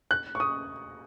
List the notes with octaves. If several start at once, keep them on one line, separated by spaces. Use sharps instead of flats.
F#6
C#6
D#6